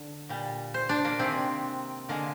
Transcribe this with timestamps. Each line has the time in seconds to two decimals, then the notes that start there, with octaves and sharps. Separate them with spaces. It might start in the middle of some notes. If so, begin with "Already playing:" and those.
Already playing: D3
0.29 A#2 G3
0.74 C5
0.89 D4
1.05 A#3
1.19 C3 D#3 G#3 C4
2.09 D3 G#3 A#3